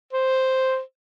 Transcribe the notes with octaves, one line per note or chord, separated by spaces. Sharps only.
C5